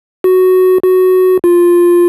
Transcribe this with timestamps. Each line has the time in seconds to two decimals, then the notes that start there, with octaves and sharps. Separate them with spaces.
0.24 F#4
0.83 F#4
1.44 F4